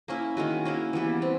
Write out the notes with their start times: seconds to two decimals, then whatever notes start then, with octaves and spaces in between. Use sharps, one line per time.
0.08 A#3 C#4 E4
0.37 D#3 G#3 C#4 F#4
0.65 A#3 C#4 E4
0.93 E3 G3 B3
1.22 C4